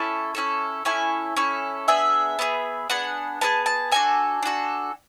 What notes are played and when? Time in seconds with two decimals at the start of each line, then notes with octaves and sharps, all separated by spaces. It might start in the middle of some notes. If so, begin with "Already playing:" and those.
Already playing: C#4 E4 A4 A5
0.35 C#4 E4 A4
0.85 C#4 E4 A4 G#5
1.36 C#4 E4 A4
1.88 B3 D4 G#4 E5
2.39 B3 D4 G#4
2.90 B3 D4 G#4 F#5
3.41 B3 D4 G#4 A5
3.66 A5
3.92 D4 F#4 A4 G#5
4.43 D4 F#4 A4